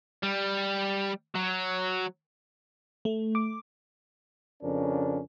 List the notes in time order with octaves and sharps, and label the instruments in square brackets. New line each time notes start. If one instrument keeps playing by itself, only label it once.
[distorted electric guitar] G3
F#3
[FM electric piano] A3
D6
[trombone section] F2 C#3 C#4 D4 A#4